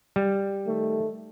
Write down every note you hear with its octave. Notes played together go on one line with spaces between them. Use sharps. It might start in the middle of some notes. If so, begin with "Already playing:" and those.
G3
D#3 A3